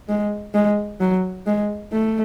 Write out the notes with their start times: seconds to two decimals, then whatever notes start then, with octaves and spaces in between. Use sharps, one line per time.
0.09 G#3
0.54 G#3
1.00 F#3
1.47 G#3
1.92 A3